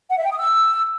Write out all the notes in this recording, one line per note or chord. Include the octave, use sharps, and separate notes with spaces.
F#5
E5
G5
D#6
E6